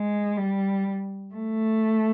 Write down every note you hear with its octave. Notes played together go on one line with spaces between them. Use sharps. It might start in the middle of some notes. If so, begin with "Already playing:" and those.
Already playing: G#3
G3
A3